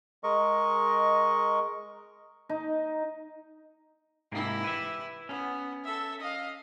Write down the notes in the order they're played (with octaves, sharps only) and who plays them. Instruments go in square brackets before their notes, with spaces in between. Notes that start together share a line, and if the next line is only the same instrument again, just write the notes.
[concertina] G#3 A#4 D#5 C#6
[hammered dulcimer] D#4
[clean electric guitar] G#2 C3 A#3 [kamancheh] E4 G4
[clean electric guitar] B4 E5
[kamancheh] B3 [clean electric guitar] C#4
[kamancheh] A4 E5
D#5 F5